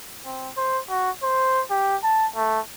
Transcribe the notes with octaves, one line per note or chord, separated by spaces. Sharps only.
C4
C5
F#4
C5
G4
A5
A3